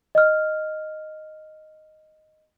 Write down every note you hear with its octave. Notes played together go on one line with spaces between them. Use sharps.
D#5 F6